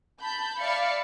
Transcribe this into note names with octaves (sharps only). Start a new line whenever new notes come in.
A5 B5 G6
D5 E5 F5 B5 C#7